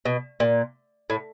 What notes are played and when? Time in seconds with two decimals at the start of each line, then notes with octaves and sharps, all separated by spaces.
0.05 B2
0.40 A#2
1.10 A2